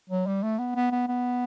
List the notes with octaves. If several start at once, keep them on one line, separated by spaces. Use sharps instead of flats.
F#3
G3
A3
B3
B3
B3
B3